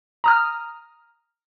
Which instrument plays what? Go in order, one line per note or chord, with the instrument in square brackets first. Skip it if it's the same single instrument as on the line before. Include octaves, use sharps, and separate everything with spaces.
[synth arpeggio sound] A#5 D#6 F6